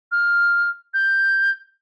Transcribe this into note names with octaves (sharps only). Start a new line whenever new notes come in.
F6
G6